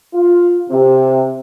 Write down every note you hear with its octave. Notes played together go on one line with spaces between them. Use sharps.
F4
C3